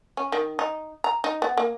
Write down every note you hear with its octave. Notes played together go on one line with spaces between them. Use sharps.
C#4
D#3
D#4
A#5
D#4
B3
A#3